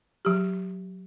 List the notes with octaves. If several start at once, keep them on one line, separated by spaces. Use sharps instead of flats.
F#3 G4